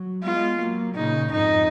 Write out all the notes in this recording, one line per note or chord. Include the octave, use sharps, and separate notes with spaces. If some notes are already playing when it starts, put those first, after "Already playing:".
Already playing: F#3
G#3 B3 F4
F#3 A#3
A#2 C#3 D#4
F2 G#2 D#4